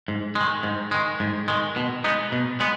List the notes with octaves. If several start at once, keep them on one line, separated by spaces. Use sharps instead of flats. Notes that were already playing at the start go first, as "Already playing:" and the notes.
G#2
D#3 G#3
G#2
D#3 G#3
G#2
D#3 G#3
B2
G#3 B3 D#4
B2
G#3 B3